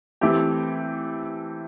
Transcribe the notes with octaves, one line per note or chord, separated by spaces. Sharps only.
E3 A3 C4 G4